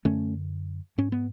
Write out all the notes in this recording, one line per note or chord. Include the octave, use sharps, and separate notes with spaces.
F#2 D3 A3 C#4
G#2 C#4
B3